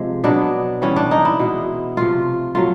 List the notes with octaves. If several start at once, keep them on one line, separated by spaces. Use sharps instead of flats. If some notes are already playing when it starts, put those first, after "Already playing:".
Already playing: C3 F3 G#3
B2 F#3 B3 D4
C3 E3 G3 B3 C#4
D4
D#4
E4
B2 G#3 B3
C3 F3 A3 F4
F#3 A3 F4